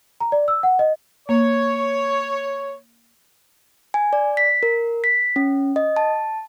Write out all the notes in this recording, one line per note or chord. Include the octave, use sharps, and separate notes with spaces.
A#5
D5
E6
F#5
D#5
A#3 C#5
G#5
D5
B6
A#4
B6
C#4
D#5
A5